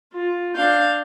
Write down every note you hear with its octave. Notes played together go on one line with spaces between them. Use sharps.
F4
D4 F5 G6